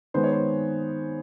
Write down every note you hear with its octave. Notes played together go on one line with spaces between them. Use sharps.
D#3 G#3 B3 C5
C#5
C5